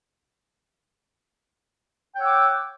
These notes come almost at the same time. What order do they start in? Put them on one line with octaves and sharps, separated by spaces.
G5 C#5 F#5 E6 D6